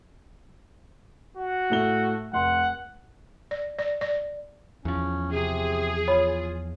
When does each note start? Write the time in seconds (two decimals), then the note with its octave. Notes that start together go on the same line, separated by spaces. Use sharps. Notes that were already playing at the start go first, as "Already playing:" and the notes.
1.37 F#4
1.70 A2 A3 G7
2.33 F1 F#5 C6
3.51 D5
3.79 D5
4.01 D5
4.85 E2 F3 C#4
5.32 C3 G#4
6.08 F4 C#5 B5